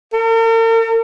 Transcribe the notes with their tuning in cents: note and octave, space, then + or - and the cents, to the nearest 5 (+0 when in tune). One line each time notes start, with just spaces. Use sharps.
A#4 -45